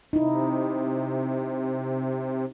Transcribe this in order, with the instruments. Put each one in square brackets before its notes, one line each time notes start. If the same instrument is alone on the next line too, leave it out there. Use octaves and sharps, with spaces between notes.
[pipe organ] C3 [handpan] D#4 E4